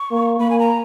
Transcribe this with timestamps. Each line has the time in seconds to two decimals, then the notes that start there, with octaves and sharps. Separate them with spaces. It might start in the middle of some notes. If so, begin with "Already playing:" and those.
Already playing: C#6
0.11 A#3
0.40 A#3 B5
0.50 G#5
0.59 A#5